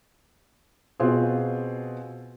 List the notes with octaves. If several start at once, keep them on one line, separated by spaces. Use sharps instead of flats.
B2 C4 F4 G#4